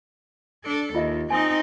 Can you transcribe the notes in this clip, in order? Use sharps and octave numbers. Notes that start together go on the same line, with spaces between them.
D4 A4
D#2 F4 D#5 E5
C4 D#4 G#5 D#6